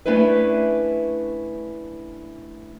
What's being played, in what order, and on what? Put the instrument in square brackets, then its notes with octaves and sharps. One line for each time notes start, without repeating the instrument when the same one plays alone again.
[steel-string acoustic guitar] A3 C#4 D4 E4 B4